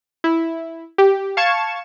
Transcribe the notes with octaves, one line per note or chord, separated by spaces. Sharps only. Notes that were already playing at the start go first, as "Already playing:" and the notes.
E4
G4
F5 A5 C#6 G#6 C#7 E7